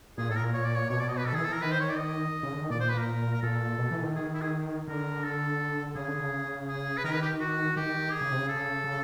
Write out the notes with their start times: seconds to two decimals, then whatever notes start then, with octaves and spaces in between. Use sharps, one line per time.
0.18 A#2 G#4
0.29 A2 A4
0.36 A#4
0.41 A#2
0.54 C#5
0.64 D5
0.75 C#5
0.90 B2 C#5
1.00 D5
1.08 D#5
1.17 B4
1.26 B2 A4
1.33 D#3 E3 G#4
1.44 A4
1.50 E3 A#4
1.62 D#3 B4
1.72 C5
1.80 C#5
1.89 D5
1.98 D#5
2.43 C#3
2.52 D3
2.61 D#3
2.70 A#2 D5
2.80 C5
2.89 B4
2.98 A#4
3.33 A#4
3.42 A#2 A4
3.79 B2
3.91 E3
4.03 D#3
4.15 G#4
4.33 E4
4.42 G#4
4.88 D3 A#4
5.24 A4
5.95 C#3 G#4
6.08 D3
6.20 C#3
6.68 G#4
6.98 B4
7.04 D#3 A#4
7.13 B4
7.22 G4
7.40 F#4
7.76 D#3 G4
8.12 G#4
8.21 C#3
8.31 C3
8.39 C#3
8.49 A4
8.84 C#3